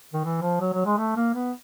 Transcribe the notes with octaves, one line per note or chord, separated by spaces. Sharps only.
D#3
E3
F3
F#3
F#3
G#3
A3
A#3
B3